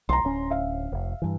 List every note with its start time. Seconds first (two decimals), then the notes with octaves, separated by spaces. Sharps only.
0.09 B1 A#5 C6
0.24 D1 C#4
0.50 E5 F5
0.92 F1
1.22 G2 E3